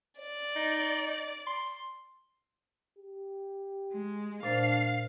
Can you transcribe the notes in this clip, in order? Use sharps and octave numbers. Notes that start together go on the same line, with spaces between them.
D5
D#4
C6
G4
G#3
A#2 D4 C5 F5 A6